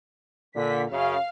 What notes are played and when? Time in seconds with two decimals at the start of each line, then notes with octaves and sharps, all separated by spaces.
0.56 A#2 D3 B6
0.90 F#2 C#3 F5